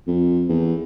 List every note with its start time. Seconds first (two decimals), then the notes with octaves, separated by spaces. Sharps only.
0.07 F2
0.49 E2